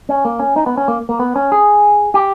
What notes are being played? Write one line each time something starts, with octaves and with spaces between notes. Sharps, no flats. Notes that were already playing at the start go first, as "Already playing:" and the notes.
C#4
A#3
C#4
D#4
B3
C#4
A#3
A#3
B3
C#4
G#4
G4